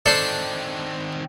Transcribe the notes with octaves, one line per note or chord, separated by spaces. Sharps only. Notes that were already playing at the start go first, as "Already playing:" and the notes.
D#3 C4 D4 A4 C5